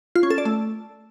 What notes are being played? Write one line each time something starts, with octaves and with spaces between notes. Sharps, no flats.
F4
C#4
A4
D5
A3